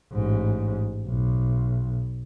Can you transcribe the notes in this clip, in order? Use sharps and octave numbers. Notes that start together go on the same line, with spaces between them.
A1 G#2
B1